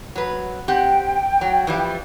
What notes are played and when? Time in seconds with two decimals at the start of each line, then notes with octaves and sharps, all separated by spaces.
0.16 F#3 B4
0.68 C4 G4 F#5 G5
1.41 F#3
1.67 E3 F3 G3